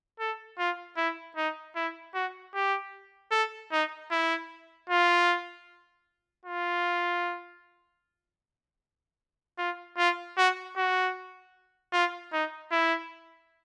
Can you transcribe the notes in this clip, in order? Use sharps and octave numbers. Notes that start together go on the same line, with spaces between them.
A4
F4
E4
D#4
E4
F#4
G4
A4
D#4
E4
F4
F4
F4
F4
F#4
F#4
F4
D#4
E4